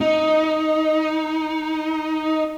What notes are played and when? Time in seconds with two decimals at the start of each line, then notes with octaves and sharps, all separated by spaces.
0.01 D#4